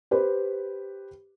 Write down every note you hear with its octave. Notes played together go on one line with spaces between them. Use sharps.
G4 B4 C5